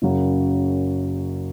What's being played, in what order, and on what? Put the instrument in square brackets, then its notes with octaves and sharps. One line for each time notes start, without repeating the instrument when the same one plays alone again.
[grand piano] F#1 F#2 C#3 F#3